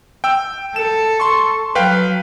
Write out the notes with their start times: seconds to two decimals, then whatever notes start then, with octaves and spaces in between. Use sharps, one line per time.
0.24 G5 E6
0.76 A4 E7
1.20 C6 C#6
1.75 F#3 B4 F5 G5